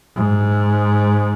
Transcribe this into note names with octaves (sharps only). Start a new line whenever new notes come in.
G#2